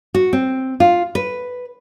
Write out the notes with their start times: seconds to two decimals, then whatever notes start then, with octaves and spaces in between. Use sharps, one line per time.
0.14 F#4
0.33 C4
0.80 F4
1.15 B4